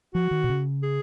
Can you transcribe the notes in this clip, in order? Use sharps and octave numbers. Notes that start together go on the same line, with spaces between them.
F3 F#4
D#3
B2
C#3
G#4